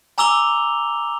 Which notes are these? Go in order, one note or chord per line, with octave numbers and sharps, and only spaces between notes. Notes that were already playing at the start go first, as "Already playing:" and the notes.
G#5 A#5 D6 E6 F7 G7